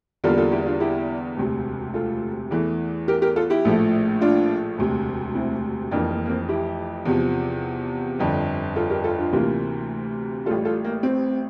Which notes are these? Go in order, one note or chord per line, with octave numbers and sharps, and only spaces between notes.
E2 D3 G3 A#3 F4 A4
F4 A4
E4 G4
D4 F4
E4 G4
E1 D2 C3
F4 A4
E2 E3 A3
G4 A#4
G4 A#4
F4 A4
E4 G4
A#1 A2 F3 A3
D4 F4
E1 D2 C3
C4 E4
F1 F2 E3 A#3 D4
A#3
A#3
C4
E4 G4
E2 C3 F3
G1 F2 D3
F4 A4
G4 A#4
F4 A4
D4 F4
D2 C3 E3 A#3
A1 A2 G3 F4 A4
F4 A4
A#3
C4